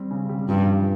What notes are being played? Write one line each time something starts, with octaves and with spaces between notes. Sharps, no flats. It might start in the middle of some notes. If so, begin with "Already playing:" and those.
Already playing: G3 C4
C#3
G3
G2 F3
F3